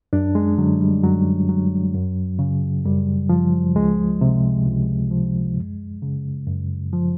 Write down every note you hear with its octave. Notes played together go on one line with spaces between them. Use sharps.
F#2 D4
G#3
D3 F#3
G3
F#2 F#3
F#3
F#2
C#3
F#2 G3
F3
C#2 G#3
C3
C#2
F3
F#2
C#3
F#2
F3